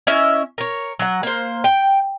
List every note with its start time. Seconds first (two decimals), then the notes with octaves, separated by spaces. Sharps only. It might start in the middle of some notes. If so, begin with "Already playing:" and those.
0.07 C#4 E4 D#5 E5
0.58 A#4 C#5
0.99 F#3 F#5
1.23 A#3 C5
1.64 G5